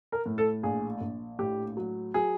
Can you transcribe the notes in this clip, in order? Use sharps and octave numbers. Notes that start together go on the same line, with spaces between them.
A#4
A2
A4
A#1 G#4
A#1
A2 G4
F#3
F#3 G#4